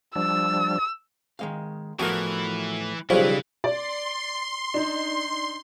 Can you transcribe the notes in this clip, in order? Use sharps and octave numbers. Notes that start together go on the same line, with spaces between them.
F3 G3 D4 E6
D#3 G#3 F5
A2 E3 F3 B3 F#4 A#4
B1 C#3 F3 G3 E4 B4 C#5
D5 C6
D4 D#4